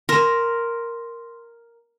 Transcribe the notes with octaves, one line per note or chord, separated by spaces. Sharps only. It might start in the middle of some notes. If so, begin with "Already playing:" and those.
A#4 C6 A#6 E7